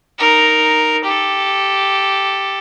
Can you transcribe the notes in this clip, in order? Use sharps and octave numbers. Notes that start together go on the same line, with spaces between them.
D#4 A#4
G4 A4